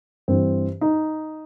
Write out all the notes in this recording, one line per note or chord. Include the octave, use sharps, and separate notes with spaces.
G2 E3 C4
D#4